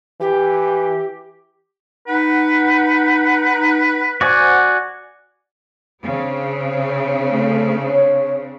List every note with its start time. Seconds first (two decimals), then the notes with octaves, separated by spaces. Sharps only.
0.20 E3 G4
2.08 D#4 B4 F#5
4.21 F#4 C5 D5 F#5 G#5
6.03 C#3 C4 D4
7.30 A3
7.90 C#5